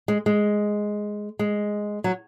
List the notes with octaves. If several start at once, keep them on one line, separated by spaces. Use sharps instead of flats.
G#3
G#3
G#3
F#3